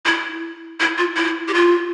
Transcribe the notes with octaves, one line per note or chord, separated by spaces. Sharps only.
E4
E4
F4
E4
G4
F4